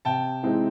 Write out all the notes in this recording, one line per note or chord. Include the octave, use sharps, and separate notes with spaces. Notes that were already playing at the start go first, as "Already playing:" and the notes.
C3 G5 A5
E3 G#3 C4 D#4